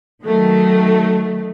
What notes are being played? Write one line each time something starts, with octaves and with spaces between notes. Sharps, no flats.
D#3 F#3 A3